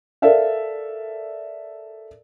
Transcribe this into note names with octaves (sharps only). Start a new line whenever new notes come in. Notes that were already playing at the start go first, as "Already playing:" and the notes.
A4 A#4 D5 E5 F5